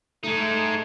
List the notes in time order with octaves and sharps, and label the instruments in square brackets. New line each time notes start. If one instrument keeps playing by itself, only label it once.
[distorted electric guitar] G#3 D#4 [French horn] A3